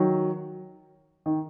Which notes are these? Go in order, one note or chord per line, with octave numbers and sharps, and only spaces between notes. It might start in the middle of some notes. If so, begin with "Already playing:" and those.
Already playing: D#3 F#3
D#3